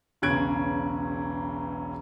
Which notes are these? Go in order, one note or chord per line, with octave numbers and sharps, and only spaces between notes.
E1 B1 C#3 F#6 G#6 D7